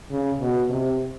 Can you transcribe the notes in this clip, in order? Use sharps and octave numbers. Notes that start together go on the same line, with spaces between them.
C#3
B2
C3